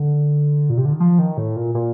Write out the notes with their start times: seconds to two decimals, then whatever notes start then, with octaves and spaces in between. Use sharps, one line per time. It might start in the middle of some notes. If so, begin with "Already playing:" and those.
Already playing: D3
0.70 A#2
0.77 C3
0.85 D3
0.92 D#3
1.00 F3
1.19 D#3
1.37 A2
1.56 A#2
1.75 A#2